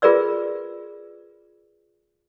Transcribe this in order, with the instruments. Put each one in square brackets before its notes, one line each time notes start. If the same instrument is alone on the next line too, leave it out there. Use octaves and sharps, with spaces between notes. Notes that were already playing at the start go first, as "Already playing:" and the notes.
[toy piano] F4 G#4 A#4 B4 D5 E6